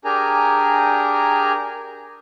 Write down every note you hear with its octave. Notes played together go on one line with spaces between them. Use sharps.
D4 G4 G#4 A#4 G#5 A#5